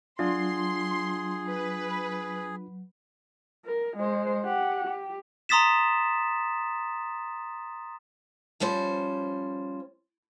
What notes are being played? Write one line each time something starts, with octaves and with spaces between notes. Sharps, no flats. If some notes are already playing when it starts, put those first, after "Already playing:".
F#3 D4 F4 G#4 C6
B4
A#4
G#3 C5
G4 F#5
G4
A#5 C6 D#6 A6 B6 E7
F3 G3 C#4 C5